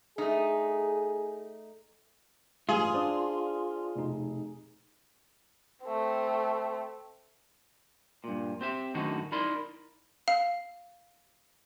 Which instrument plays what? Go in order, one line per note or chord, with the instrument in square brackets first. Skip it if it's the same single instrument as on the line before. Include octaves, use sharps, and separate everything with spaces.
[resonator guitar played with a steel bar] A3 D#4 [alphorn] G#4
[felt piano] A1 G2 [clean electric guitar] F4 [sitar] G#4
[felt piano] D4 [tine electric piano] C5 D5 D#6
[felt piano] F1 [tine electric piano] B2 D#4
[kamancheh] A3 C4
[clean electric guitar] G2 A#2
C4 G4 E5
F#2 A2 D3 D#3 D#4 F#4
D#4 E4 A#4 D5 B5 C6
[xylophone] F5